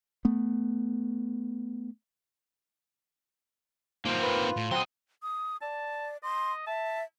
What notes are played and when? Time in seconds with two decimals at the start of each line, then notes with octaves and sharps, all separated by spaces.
0.25 A3 B3
4.05 A#3 C4 D#4 F4 C5
4.23 B4
4.56 A2
4.71 F#3 C4 D#5 C6
5.23 D#6
5.62 D5 A5
6.23 D#5 C6
6.67 E5 A5